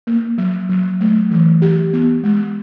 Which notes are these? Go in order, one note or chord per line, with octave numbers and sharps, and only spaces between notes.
A#3
F#3
F#3
A3
E3
G4
B3
G#3